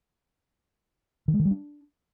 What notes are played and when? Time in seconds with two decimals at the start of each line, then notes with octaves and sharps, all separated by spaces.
1.28 D#3
1.34 G#3
1.39 D#3
1.45 G3
1.51 D4